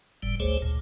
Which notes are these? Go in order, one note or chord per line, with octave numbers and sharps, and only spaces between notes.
G1 A2 G3
G#1 D2 A3 G#4 C5 C#5
D2 A#2